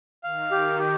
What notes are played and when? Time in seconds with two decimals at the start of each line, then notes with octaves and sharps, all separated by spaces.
0.23 D#3 F5
0.51 G4
0.79 G4